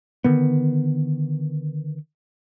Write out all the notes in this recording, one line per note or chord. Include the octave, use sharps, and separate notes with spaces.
D3 D#3 B3